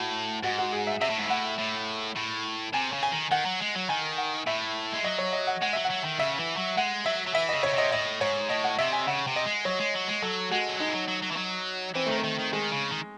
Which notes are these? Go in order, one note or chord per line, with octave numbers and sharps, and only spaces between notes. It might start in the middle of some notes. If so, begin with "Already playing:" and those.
Already playing: A2 F#4
G#2 F#4
F#4
G#4
E5
C3 E5
A2
G#2
A2 F#5
A2
A2
C3 G#5
C#3
G#5
D#3
D#3 F#5
F#3
G#3
F#3
D#3 G#5
F#5
A2 E5
G#3
F#3 D#5
C#5
D#5
F#5
G#3 F#5
F#3 E5
F#5
F#3
D#3
C#3 E5
E3
F#3
G#3 F#5
F#3 E5
F#3
E3 E5
C#3 D#5
C#3 C#5
C3 D#5
A2 D#5
G#2 C#5
A2 D#5
F#5
C3 E5
G#5
C#3 F#5
C3
D#5
G#3
F#3 C#5
G#3
F#3
G#3
F#3 A4
G#3 F#4
F#3
G#3 D#4
E3
F#3
F#3
F#3
E3
F#3
E3 C4
D#3 A3
C4
D#3
D#3
D#3 G#3
C#3
D#3